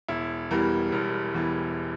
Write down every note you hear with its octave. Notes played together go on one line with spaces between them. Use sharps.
E1 E4
E2 E3 G3 A#4
E1 A#4
E2 E3 G3